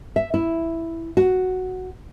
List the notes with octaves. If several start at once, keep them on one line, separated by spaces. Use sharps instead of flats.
E5
E4
F#4